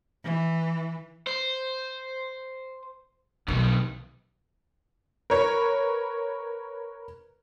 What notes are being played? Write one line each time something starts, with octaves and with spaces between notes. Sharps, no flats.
E3
C5
B1 F2 D#3
A#4 B4 C#5